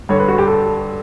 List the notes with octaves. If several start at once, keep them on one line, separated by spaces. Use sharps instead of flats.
G2 D3 C#5
B4
F#4
G4
A4